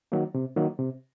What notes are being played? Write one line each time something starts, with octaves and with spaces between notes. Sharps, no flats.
D#3 F#3 A#3
C3
D#3 F#3 A#3
C3